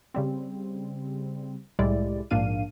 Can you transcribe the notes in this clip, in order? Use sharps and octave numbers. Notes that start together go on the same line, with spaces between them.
C#3 G3 C4
C2 A2 G3 G#3 E4 D5
A#1 G#2 A#3 D4 F5 D#7